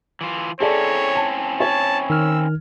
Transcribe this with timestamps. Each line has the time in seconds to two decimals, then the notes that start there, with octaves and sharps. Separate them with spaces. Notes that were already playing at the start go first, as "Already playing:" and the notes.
0.21 E3 F4
0.60 C4 C#4 E4 G#4 A4 C#5 D5
1.15 A5
1.60 C#5 A5
2.10 D#3 E6 F6